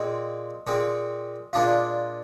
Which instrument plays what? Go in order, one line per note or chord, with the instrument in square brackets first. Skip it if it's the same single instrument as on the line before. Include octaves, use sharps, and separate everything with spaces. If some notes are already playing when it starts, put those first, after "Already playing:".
Already playing: [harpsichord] A#2 G#3 C4 [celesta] D#5
[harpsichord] A#2 G#3 C4
[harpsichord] A#2 G#3 D4 F4 [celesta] F5